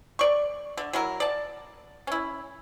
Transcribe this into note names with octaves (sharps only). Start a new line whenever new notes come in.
D5 C#6
D3
F#3 E4 A#4
D5 A5
C#4 E4